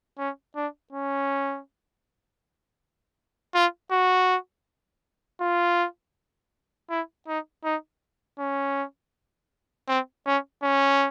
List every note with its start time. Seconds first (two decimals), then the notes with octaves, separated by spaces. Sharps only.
0.18 C#4
0.55 D4
0.93 C#4
3.54 F4
3.91 F#4
5.41 F4
6.90 E4
7.28 D#4
7.64 D#4
8.39 C#4
9.88 C4
10.26 C#4
10.63 C#4